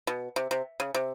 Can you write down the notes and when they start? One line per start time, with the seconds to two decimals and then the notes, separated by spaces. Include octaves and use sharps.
0.07 B2
0.36 C3
0.51 C3
0.80 C#3
0.94 C3